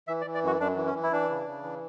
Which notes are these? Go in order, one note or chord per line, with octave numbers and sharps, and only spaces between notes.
E3 E5
D5
E3
D5
F#2 F#4
F#2 D4
E3
C#4
E3
E4
E3 D4
C#3
C#3
E3